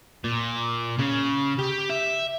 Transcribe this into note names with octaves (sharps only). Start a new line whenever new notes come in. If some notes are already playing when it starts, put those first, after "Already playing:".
A#2
C#3
G4
E5